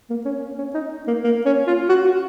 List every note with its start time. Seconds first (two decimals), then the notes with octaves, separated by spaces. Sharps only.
0.10 A#3
0.25 C#4
0.59 C#4
0.74 D#4
1.07 A#3
1.24 A#3
1.46 C#4
1.67 F4
1.89 F#4
2.05 F#4